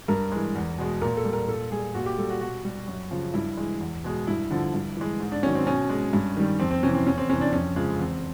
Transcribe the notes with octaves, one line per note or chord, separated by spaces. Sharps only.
G2 A#4
E3 G#3
E2
B2 G#3
A#2 A#4
A4
G3
A#4
A#2 A4
G3 G#4
A#2 F#4
G4
G3 A4
F#4
B2 F#4
G3
F#2
C#3 F3
G2 E4
E3 G#3
E2
B2 G#3
G2 E4
D3 F3
G2
E3 G#3
G#2
D4
D#3 F#3 C#4
C4
B2 C#4
G#3
G2
D#3 G3
F2 C4
C4
C3 E3 C#4
C4
E2 C#4
C4
C3 E3 C#4
D4
F2 C#4
C#3 F3 G#3
E2 C4